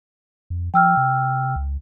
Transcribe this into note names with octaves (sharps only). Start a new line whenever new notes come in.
F2
F3 G5 E6 F6
C3
C#2